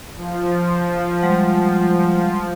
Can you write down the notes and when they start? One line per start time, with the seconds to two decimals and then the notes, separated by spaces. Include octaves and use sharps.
0.16 F3
1.22 G3 G#3 F#5